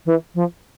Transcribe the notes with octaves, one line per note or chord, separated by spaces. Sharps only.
E3
F3